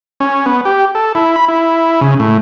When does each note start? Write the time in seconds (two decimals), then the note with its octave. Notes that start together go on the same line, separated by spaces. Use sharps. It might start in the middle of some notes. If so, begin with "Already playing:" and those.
0.20 C#4
0.46 B3
0.65 G4
0.95 A4
1.15 E4
1.36 B5
1.48 E4
2.01 C#3
2.20 A2